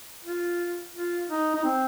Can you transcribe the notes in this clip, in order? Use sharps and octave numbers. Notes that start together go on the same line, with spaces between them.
F4
F4
D#4
D#4
C4